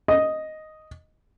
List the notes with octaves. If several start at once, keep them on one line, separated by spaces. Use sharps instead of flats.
D#5